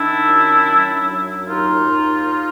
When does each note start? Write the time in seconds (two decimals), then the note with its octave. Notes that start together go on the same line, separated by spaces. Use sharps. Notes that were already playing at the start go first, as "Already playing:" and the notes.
Already playing: D#3 D4 E4
0.27 F#2
0.67 F#3
1.08 F#2
1.48 D#2 D#4 F4
1.89 D#2